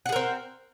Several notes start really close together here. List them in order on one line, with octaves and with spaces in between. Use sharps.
F#5 G#4 A#4 C4